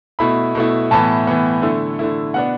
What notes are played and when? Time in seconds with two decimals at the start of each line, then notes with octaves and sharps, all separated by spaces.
0.19 B2 A3 E4 B5
0.55 B2 A3 E4
0.91 A2 E3 B3 A5
1.27 A2 E3 B3
1.62 D3 A3 E4
1.99 D3 A3 E4
2.34 B2 B3 D4 F#5